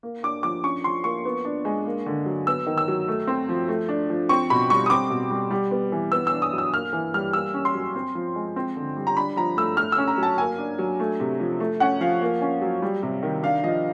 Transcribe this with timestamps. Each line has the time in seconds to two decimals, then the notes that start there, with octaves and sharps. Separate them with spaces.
0.03 A#3
0.23 D4 D6
0.43 F3 D6
0.63 C#4 C#6
0.84 F3 C6
1.04 A#3 C#6
1.25 B3
1.45 D4
1.65 G#3
1.86 A#3
2.06 D3
2.26 F#3
2.47 B3 E6
2.66 D#3
2.78 E6
2.88 F#3
3.08 A3
3.27 C4
3.49 F3
3.68 A3
3.89 D4
4.10 F3
4.29 C4 C#6
4.50 B2 B5
4.70 G3 C#6
4.86 D#6
4.90 C4 D6
5.10 B2
5.31 G3
5.51 G3
5.71 B3
5.92 E3
6.12 B3 E6
6.27 E6
6.33 D4
6.42 D#6
6.53 F#3
6.58 E6
6.74 A#3 F6
6.93 E3
7.14 G3 F6
7.33 A#3 E6
7.54 C#4
7.65 C6
7.75 F#3
7.96 C4
8.15 F3
8.35 G#3
8.56 C4
8.76 D3
8.97 G3
9.07 A#5
9.16 D4 B5
9.36 F3 A#5
9.57 A3 E6
9.77 A3 F6
9.92 E6
9.98 C#4
10.08 A#5
10.18 F#3
10.23 A5
10.38 A#3 G#5
10.58 D4
10.79 F#3
11.00 A3
11.20 C3
11.40 F3
11.60 A3
11.80 C#4 F#5
12.01 F3 F5
12.21 A#3
12.41 C#4
12.62 F#3
12.82 G3
13.03 C3
13.23 D#3
13.43 D4 F5
13.63 F3 D#5